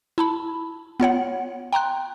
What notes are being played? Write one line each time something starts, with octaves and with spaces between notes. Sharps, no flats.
E4 A5 B5
B3 F4 C#5 F#5
G5 A#5 C6 F#6